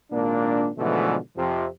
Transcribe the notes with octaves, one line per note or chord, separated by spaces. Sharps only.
G#1 A#2 A#3 D4
G#2 B2 D3 E3 F3 A3
F2 C3 F3